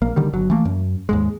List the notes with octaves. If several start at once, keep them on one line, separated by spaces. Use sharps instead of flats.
A#1 A#3
D3 D#3 G3
G1 F#3
E3 A3 A#3
F#2
D#2 G#2 G#3